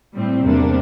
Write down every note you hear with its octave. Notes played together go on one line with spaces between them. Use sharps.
A2 G3 C4
E2 C3 G3 A#3 D4